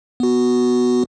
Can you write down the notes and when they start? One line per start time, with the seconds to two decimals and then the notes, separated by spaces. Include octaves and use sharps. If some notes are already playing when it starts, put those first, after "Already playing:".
0.20 B3 F#4